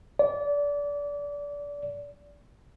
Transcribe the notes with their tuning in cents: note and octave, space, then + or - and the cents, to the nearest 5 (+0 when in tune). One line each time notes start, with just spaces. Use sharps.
D5 -25